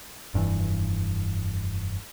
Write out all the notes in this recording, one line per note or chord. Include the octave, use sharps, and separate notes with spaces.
F1 G2 B2 E3